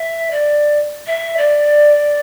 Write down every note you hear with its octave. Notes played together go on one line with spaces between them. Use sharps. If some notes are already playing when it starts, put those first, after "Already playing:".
Already playing: E5
D5
E5
D5